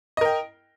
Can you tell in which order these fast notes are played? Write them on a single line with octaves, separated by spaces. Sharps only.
D#5 A#4 G5